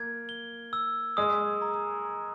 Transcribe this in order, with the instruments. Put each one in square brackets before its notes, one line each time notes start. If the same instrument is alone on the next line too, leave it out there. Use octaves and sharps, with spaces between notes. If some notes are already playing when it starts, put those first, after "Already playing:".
Already playing: [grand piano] A#3 [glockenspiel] G#6
[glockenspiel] G7
E6
[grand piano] G#3 [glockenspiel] D#6
[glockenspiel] A#5
A#5